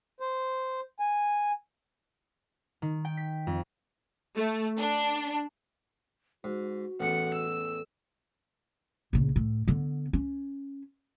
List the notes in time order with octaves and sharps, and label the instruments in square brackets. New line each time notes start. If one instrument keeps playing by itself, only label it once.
[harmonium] C5
G#5
[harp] D#3
G5
B6
F2
[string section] A3
D4
[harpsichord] G#2 [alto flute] F#4
[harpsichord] A1 E2 [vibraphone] A4 [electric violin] F#5 C#7
[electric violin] E6
[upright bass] A#1 C#3
A2
D3 B3
C#4